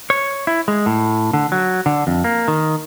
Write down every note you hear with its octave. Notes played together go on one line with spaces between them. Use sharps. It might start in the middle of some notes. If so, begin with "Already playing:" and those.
C#5
E4
G#3
A2
D3
F#3
D3
F2
A#3
D#3